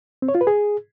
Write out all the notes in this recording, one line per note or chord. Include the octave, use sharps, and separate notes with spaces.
C4
C#5
F4
B4
G#4